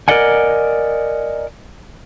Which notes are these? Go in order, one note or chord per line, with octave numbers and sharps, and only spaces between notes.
A#4 C5 D5 D#5 F#5 G#5